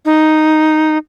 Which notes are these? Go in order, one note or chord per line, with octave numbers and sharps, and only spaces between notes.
D#4